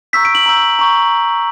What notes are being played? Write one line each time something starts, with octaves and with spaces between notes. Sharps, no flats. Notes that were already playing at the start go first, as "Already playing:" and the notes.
A#5 C#6 E6 G6 B6
D7
F#7
A#5 C#6 E6 G6
A#5 C#6 G6